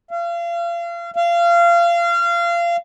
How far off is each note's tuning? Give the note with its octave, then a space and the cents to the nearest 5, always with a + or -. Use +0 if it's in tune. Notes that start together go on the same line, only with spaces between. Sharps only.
F5 -35
F5 -25